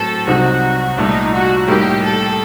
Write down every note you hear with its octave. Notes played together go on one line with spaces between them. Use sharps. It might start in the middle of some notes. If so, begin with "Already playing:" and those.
Already playing: A2 F#3 C4 A4
C2 C3 F#3 C4 D#4 F#4
C2 A#2 A3 D#4
F#4
A2 G3 A#3 D#4 G4
A4